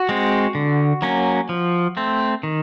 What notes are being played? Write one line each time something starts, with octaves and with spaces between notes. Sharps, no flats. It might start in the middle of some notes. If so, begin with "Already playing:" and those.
Already playing: F#4
G#3 C4
D3
F#3 A#3 C#4
F3
A3 C4
D#3